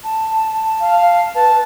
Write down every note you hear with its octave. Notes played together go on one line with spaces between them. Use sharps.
A5
F5
B4 A5